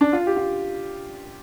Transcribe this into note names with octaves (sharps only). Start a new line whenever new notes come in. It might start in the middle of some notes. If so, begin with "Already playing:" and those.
D4
F4
G4
F4